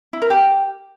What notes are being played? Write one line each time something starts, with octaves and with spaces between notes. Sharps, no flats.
E4
A#4
G4